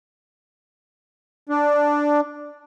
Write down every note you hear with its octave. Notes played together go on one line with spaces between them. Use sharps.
D4